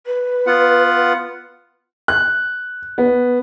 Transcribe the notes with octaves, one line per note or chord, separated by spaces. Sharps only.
B4
B3 F4 F#5
F#6
B3